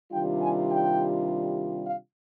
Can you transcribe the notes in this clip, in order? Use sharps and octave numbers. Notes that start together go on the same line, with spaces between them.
C3 D#3 G3 D4 F4 G5
G#5
G5
F5